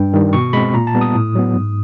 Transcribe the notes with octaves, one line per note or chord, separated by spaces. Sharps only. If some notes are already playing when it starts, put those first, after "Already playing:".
Already playing: G2 G5
D#3 G3
B2 C#6
G#3 C4 B5
A#2 A#5
A5
G3 B3
D#6
A2
F#3 B3
G#2